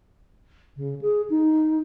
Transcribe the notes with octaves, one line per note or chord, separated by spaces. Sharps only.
C#3
G#4
D#4